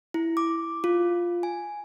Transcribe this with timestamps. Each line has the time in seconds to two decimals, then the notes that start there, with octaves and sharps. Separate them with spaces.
0.14 E4
0.37 D6
0.84 F4
1.43 G#5